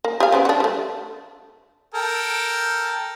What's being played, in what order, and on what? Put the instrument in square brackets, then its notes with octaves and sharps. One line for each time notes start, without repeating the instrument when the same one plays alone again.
[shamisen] A#3
G4 G#4 F5
C#3 B3 C4
D4 F#4
G3 A3
[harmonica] A4 A#4 G5